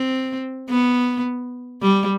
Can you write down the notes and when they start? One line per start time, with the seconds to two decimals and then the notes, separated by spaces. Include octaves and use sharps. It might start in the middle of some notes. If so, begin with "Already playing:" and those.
Already playing: C4
0.69 B3
1.82 G3